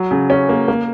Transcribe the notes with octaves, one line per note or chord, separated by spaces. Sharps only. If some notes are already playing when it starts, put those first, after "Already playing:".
Already playing: F#3
C#3
C#4
A#3
A#3